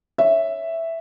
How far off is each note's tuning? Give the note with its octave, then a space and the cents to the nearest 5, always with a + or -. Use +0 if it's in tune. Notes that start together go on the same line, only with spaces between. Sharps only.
C#5 +0 E5 +0